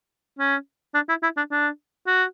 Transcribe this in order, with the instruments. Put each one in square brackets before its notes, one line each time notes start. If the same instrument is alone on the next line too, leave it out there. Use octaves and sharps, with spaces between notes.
[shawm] C#4
D4
E4
E4
D4
D4
F#4